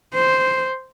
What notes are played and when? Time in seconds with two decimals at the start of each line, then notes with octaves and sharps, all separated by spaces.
0.15 C5